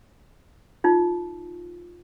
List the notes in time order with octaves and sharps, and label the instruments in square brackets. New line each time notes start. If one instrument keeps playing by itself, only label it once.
[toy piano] D#4 F4